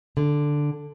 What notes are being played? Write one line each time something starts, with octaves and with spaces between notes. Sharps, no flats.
D3